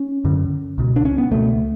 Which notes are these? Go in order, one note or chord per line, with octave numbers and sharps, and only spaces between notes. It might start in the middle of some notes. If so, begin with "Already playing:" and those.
Already playing: C#4
F#2 D3
C#2 B2
D4
C#4
B3
C#2 B2 A3